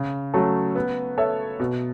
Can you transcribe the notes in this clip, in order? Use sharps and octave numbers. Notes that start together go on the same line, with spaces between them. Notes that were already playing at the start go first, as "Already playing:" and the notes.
Already playing: C#3
F#3 A3 C#4 A4
B3
A4 C#5 E5
B2